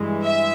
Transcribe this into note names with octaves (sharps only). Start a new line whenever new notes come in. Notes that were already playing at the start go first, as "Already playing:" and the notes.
Already playing: G2 E3 G#3
E5